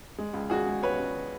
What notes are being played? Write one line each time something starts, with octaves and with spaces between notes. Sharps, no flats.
G#3
C#2
C#2 F#4 G#4
G#3
C#2 B4 C#5
C#2